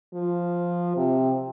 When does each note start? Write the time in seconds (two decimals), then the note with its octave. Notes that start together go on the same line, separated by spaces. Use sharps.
0.14 F3
0.97 C3